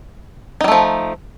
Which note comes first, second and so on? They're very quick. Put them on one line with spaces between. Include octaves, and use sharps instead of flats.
D#4 G3 A3 F3